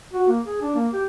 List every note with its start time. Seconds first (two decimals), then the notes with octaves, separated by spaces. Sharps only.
0.13 F#4
0.28 A#3
0.45 G#4
0.61 D4
0.75 A#3
0.93 G4